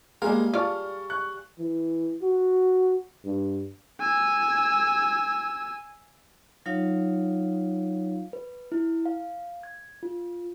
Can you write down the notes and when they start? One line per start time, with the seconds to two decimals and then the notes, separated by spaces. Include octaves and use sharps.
0.22 G3 G#3 A#3 G#4 A#4 F5
0.54 F4 D5 A5 C#6 F6
1.10 C#6 F#6
1.59 E3
2.22 F#4
3.25 G2
4.01 G#5 E6
6.66 F#3 D#4 F4 C#5 F5
8.33 B4
8.72 E4
9.06 F5
9.63 G#6
10.03 F4